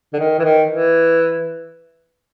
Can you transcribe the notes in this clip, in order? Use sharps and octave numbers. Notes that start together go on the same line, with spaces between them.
D3
D#3
E3
D#3
E3